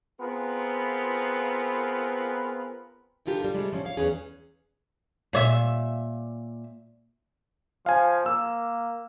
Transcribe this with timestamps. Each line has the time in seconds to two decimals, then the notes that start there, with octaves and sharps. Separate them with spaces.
0.20 B3 C4 F4 G#4 A#4 B4
3.26 E2 G#2 D3 F4 G4 A#4
3.40 G3 F4
3.54 C3 G3 G#3
3.73 F3 C#4
3.85 C#5 F5
3.97 E2 E3 C#4 G#4
5.33 A#2 C#5 E5
7.86 F3 F5 G#5
8.26 A#3 E6